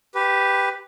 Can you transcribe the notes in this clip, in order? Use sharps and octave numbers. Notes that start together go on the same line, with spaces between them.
G4 B4